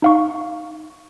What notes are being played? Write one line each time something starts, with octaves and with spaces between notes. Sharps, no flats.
D#4 F5 C#6